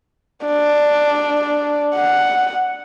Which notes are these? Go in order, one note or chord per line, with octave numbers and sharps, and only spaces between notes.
D4
F#5